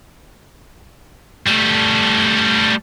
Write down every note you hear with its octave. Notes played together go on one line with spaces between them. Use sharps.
G3 A3